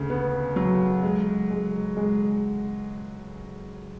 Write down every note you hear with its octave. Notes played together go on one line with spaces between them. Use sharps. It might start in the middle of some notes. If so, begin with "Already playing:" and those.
Already playing: D2 C#3
B3
F#3
G#3
G#3
G#3